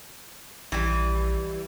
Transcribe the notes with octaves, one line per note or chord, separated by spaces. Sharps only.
A#1 E3 G3